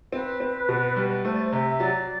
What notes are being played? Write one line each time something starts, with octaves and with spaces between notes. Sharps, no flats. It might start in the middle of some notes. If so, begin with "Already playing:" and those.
C4 B4
C4
B2
G3
A3 C5
D5
C5
C3 E5
F#3 D5